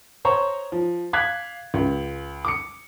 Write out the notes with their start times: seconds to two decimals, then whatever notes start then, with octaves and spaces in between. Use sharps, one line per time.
0.25 C5 C#5 A#5 C#6
0.72 F3
1.13 F5 D6 F#6 G#6 B6
1.74 C#2
2.45 D6 C#7